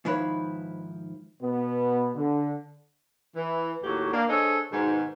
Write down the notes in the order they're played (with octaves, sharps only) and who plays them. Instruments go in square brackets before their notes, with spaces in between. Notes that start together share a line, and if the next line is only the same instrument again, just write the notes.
[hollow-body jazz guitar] G#2 D#3 F3 E4 B4 C#5
[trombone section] B2 B3
D3
[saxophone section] E3
D#2 A2 F#3 A#3 F#4 G4
A#3 D4
D4 G#4 A4 C5 C#5 D#5
G#2 B2 D#3